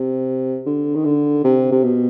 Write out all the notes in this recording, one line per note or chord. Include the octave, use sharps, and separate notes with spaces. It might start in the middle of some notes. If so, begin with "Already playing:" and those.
Already playing: C3
D3
D#3
D3
C3
C3
B2